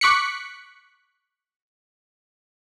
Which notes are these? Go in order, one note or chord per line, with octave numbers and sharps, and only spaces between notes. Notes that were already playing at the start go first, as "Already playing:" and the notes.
C#6 D6 F#6 B6 C#7